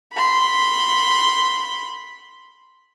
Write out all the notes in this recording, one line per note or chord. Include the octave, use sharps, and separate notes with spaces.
B5 C6